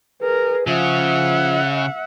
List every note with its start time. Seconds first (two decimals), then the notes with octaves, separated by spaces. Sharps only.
0.22 G#4 A#4 B4
0.67 C#3 F3 E5 F#5